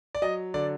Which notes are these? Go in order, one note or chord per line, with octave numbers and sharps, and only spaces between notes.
D5
F#3 D#5
D3 D5